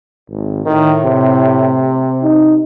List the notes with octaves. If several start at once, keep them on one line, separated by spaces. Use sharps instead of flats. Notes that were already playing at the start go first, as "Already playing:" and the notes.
G#1
A2 D#3
C3
D#4